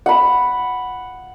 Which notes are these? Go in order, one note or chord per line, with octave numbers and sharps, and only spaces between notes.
F#5 B5